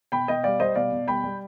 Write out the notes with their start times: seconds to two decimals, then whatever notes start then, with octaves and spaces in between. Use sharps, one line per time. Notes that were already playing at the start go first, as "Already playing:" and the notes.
0.12 B2 G5 B5
0.28 B2 D#5 G5
0.44 G3 D5 F5
0.60 G3 C5 D#5
0.76 B2 D5 F5
0.92 B2
1.07 G3 G5 B5
1.24 G3